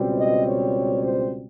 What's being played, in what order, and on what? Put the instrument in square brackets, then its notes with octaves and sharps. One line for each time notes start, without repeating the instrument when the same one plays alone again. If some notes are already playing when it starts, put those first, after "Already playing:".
Already playing: [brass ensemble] C#2 B2 G3 C4
D#5
C#5
C5